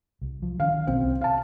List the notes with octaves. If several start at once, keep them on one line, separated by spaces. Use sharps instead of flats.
C2
F3
D#3 E3 C#4 F5
B1 B2 C4
C2
F5 A5